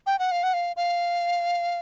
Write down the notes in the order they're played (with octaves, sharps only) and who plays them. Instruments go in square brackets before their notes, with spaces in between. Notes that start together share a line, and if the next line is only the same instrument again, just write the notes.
[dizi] G5
F#5
F5
F#5
F5
F5